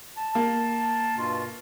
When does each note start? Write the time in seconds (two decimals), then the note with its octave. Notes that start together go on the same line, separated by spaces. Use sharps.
0.18 A5
0.35 A#3
1.17 G2 B2 F4